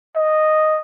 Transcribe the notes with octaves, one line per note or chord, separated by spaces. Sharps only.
D#5